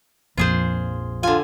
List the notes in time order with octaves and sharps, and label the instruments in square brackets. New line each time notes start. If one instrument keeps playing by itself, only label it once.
[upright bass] A#1 [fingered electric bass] F2 [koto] F4 G#4 C5
[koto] D3 G#5 [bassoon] F4